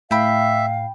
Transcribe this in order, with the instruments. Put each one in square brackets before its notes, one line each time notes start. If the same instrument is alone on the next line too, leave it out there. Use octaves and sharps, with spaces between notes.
[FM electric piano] A2 [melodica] E5 [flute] F5 [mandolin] G5 B5